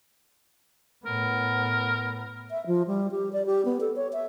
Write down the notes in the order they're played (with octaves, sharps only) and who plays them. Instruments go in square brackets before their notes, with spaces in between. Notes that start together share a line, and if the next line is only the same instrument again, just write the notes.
[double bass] A2 B3 [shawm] A#4
[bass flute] E5
F3
G3
G4
D5
G4
B3
A4
C#5
E5